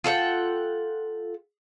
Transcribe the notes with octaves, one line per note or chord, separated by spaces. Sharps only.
F4 A4 F#5 G5